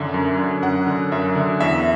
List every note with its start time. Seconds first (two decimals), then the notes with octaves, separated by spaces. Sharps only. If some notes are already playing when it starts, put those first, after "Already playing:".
Already playing: F#2 D3 E5
0.14 F#2
0.38 D3
0.62 F#2 F#5
0.87 D3
1.12 F#2 E5
1.35 D3
1.60 E2 E5